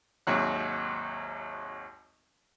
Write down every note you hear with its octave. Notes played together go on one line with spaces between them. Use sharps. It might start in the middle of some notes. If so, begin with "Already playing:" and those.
G#1 D#2 C3 F#3 F#6